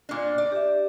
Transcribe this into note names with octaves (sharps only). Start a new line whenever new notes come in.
A#2 D4
D5
G4 E5